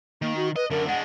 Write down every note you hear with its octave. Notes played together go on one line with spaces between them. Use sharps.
D#3 A#3
F#4
B4 D#5
F#2 D3 A#4
G#3 D4 F#5